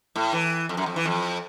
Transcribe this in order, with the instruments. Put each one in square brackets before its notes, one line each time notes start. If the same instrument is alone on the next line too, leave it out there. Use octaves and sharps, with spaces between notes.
[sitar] A2
E3
F2
F#2
F2
E3
F2